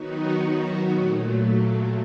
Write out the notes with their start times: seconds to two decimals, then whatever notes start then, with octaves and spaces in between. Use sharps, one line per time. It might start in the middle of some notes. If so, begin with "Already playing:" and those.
Already playing: D#3 F#3 B3 D#4 F#4
0.92 A#2 F#3 A3